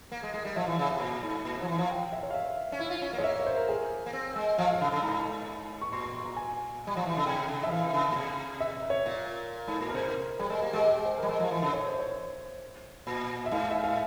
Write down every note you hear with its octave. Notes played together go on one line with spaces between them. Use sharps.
A#3
G#3
G#3
G3
F3 E5
E3
C#3
C3
A#2
G#2
A#2
C3
F3
E3
F3
G5
E5
C#5
F5
E5
C#4
E4
F4
C#4
A#3
G#3 C#5
A#3 E5
C#5
C5
A#4
G#4
A#3
C4
G#3
F3 F5
F5
C#3
C#3
G#2 A#5
C#6
A#2 C6
C#6
C6
A#5
G#5
G3
F3
E3
C#3
C3 G5
C#3
E5
F3
E3 F5
C3
C#3
A#2
C3
E5
C#5
A#2
G#2
A#2
A#4
C3 C5
A#4
G3 G#4
G#3 A#4
A#3 G4
G#3 G4
G4
G#4
C5
G3 A#4
G#3
F3
E3
C#3
C#5
C5
C#5
A#2
E5
G#2 F5
E5
F5